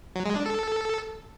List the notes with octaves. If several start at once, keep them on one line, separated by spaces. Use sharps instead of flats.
F#3
G#3
D4
A4